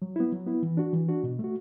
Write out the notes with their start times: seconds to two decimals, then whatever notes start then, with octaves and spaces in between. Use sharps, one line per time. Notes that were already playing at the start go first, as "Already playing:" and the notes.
0.02 F#3
0.16 B3 E4
0.32 F#3
0.46 B3 E4
0.63 E3
0.77 D4 F#4
0.93 E3
1.08 D4 F#4
1.23 B2
1.39 A3 F#4